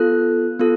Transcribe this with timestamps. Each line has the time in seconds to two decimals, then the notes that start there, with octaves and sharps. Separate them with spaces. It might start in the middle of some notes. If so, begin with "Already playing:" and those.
Already playing: B3 F4 A4 F#6
0.59 B3 F4 A4